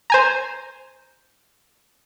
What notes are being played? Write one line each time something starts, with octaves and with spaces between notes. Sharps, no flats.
C5 G#5 A#5